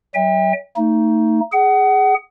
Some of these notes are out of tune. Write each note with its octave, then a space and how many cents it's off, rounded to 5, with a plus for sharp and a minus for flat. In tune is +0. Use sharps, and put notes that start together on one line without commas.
F#3 +40 E5 -30 G5 +35
A3 +40 D#4 +10
G#4 +0 F#5 +30